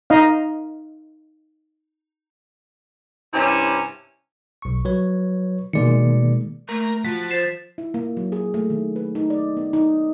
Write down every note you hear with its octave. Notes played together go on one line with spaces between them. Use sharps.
D#4 D#5 F5
G2 C3 C#4 E4
B1 C#6
F#3 B4 C#5
B2 D#3 G#3 A#3 D5 C#7
A3 A#3 A#4
F3 F#4 A5 B6
C5 A6 C7 E7
E4
A#3
F#3
G#4
A3
D#3
B4
D#4
D5
B3
D#4